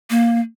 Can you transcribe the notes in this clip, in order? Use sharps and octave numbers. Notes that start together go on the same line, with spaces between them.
A#3